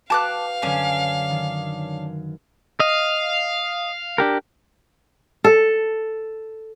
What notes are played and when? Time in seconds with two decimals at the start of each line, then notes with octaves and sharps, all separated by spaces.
0.10 F#4 B4 F5 G5 A5 D6 F#6
0.62 F#2 D3 C#4 D4 G#5
1.30 D#3
2.80 D#5 F5
4.18 D4 G4 A#4
5.44 A4